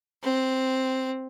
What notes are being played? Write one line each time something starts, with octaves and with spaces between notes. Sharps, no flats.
C4